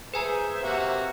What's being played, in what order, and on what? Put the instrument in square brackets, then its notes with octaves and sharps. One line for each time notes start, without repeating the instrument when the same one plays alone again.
[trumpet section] G#4 [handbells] B4 G#5 A#5 [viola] C5 E5
[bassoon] C3 [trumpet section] A#3 F#4